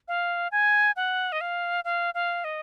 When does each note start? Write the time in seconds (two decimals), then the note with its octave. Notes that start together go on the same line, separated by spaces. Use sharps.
0.08 F5
0.52 G#5
0.96 F#5
1.32 D#5
1.41 F5
1.84 F5
2.14 F5
2.44 D#5